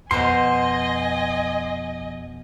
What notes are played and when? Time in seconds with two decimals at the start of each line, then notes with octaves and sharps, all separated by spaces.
0.11 F2 B2 A#4 C5 D#5 G#5 C6